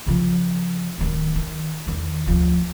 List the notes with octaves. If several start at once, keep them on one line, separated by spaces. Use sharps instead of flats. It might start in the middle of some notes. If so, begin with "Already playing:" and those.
C#3 F3
D1 D#3
D#3
E2 D#3
D2 F3